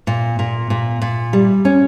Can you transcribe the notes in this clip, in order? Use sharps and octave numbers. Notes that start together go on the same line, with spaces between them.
A#2
A#2
A#2
A#2
G3
C#4